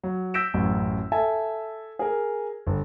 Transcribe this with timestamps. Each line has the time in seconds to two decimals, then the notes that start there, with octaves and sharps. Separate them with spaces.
0.03 F#3
0.34 E6 G6 A#6 B6 D7 E7
0.54 A1 F#2 F#3
1.12 A4 E5 G#5 A5
1.99 G#4 A#4
2.67 G1